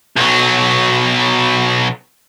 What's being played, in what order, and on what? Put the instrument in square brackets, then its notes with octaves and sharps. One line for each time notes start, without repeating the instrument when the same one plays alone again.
[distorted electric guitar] B1 F#3